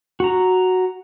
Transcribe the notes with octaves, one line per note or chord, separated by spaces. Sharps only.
F#4 A#5